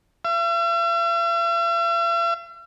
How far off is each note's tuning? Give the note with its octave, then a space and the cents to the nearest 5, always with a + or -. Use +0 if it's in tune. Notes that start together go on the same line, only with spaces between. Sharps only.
E5 +45